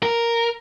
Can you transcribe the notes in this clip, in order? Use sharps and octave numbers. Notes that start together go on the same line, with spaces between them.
A#4